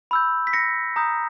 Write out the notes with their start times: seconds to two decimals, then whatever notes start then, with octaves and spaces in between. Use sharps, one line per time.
0.11 B5 E6 G6
0.47 B6
0.53 A#6 C#7
0.96 A#5 D#6 G6